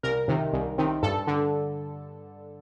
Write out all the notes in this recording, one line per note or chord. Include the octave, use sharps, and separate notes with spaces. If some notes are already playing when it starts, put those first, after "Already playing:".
C2 A#4
C3 D#3
C2
C3 D#3
G2 A4
D3